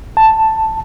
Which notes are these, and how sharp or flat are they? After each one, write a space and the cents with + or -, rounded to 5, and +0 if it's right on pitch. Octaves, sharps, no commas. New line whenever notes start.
A5 +5